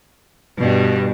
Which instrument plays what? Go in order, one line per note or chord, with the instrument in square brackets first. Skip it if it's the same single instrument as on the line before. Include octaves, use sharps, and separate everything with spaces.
[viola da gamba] G2 G3 [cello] B2